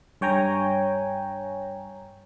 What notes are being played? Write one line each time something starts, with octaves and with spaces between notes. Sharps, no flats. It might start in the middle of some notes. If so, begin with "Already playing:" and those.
G2 C#5 G5 G#5 A#5